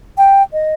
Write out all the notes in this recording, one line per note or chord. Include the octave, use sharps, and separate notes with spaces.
G5
D#5